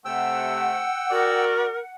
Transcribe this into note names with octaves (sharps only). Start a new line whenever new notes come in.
C3 A3 F#5 G5 E6
F#4 A#4 D5